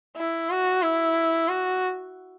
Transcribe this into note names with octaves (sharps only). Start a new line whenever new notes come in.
E4
F#4
E4
F#4